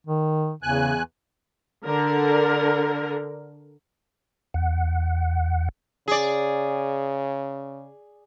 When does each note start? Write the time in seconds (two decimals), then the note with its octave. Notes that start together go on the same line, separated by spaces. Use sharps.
0.07 D#3
0.63 E2 C#3 G#5 F#6
1.85 D3 A#4
4.54 E2 F#5
6.08 C#3 G#4 D5